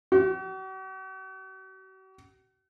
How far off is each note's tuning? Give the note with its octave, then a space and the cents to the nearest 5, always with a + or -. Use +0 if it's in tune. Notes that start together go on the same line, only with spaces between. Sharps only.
F#4 +45